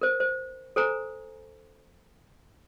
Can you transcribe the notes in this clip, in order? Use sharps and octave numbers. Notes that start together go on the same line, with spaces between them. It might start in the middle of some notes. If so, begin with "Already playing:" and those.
A#4 C5
C5
A4 C5 G#5 A#5